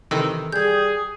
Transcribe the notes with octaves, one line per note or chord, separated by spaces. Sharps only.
C3 D#3 E3 A4 E6
G3 G#4 G6 G#6